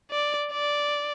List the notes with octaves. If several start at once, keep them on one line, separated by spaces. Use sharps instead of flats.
D5
D5